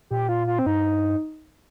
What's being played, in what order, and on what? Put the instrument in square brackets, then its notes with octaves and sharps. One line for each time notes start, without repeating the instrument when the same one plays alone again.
[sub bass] A#2 [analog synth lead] G4
[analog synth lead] F4
F4
C4
[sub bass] G2 [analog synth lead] D#4